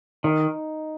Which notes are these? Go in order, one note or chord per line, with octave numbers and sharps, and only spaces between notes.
D#3 D#4